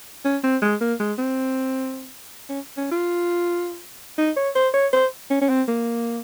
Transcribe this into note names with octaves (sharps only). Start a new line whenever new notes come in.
C#4
C4
G#3
A#3
G#3
C4
C#4
C#4
F4
D#4
C#5
C5
C#5
C5
C#4
C#4
C4
A#3